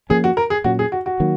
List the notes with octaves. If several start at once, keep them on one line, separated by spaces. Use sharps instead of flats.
F3 A#3 C#4 G#4
F#4
A#4
G#4
A#2 F#3 C#4 F#4
G#4
F#4
F#4
D#3 F#3 A#3